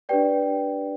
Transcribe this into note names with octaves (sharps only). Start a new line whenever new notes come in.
D4 G4 B4 D5 G5